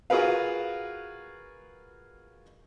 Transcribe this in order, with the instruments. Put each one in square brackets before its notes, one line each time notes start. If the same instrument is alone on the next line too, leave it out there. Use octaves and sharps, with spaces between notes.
[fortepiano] F4 F#4 G#4 A#4 B4 F5